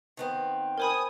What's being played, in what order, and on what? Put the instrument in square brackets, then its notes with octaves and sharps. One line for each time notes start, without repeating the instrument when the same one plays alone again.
[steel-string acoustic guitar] D#3 B3 C4
[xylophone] A#4 C5 B5 [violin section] G#5 D#6